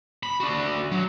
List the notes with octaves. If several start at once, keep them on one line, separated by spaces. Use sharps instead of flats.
B5
D4 F#4
F#3